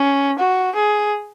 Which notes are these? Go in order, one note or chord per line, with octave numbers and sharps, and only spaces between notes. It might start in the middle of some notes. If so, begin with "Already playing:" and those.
Already playing: C#4
F#4
G#4